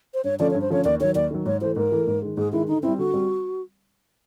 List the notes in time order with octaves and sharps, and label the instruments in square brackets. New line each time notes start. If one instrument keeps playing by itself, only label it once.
[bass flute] C5
[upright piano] G2 [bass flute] C#5
[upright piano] D3 F3 A3 C#4 [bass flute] D5
[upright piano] G2 [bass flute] C#5
[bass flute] C5
[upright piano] D3 F3 A3 C#4 [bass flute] C#5
[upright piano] D#2 [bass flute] D5
[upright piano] D#3 F#3 [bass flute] C#5
[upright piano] D#2 [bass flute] D5
[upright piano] D#3 F#3
[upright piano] G#2 [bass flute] C#5
[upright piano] E3 A3 [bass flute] C5
[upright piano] G#2 [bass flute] A#4
[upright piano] E3 A3
G#2
D#3 G#3
[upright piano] G#2 [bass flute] G#4
[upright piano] D#3 G#3 [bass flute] E4
[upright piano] D3 [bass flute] D#4
[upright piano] G3 C4 [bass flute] E4
[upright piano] D3 [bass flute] F#4
[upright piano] G3 C4